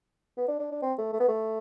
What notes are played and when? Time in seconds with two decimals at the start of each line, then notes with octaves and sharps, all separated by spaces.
0.38 B3
0.48 D4
0.59 D4
0.72 D4
0.82 C4
0.98 A3
1.13 A3
1.20 B3
1.28 A3